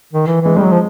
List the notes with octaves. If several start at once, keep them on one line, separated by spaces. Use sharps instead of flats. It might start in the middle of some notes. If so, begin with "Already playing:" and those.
D#3
E3
E3 G#3
G3 G#3
F#3
F3